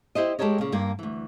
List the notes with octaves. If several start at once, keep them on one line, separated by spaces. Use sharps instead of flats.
E4 G4 C5 D#5
G#3 G4 A4 A#4 C#5 D#5
A#2 C#3
G2 A#3
D2 E3